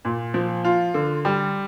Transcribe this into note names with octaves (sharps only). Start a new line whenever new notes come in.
A#2
F3
F4
D3
G3